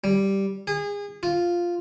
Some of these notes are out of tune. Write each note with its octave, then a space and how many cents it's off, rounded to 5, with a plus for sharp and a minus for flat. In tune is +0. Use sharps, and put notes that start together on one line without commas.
G3 -5
G#4 -30
F4 +0